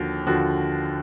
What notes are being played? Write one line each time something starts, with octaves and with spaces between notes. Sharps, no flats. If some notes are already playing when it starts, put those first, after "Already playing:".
Already playing: D#2 D3 F3 F#4
D#2 D3 F3 F#4